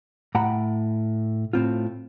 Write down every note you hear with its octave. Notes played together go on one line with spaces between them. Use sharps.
A2 F#5 G5 A#5 B5
A2 C4 F4